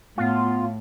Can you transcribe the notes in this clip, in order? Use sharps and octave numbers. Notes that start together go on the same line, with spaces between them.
A2 B3 F4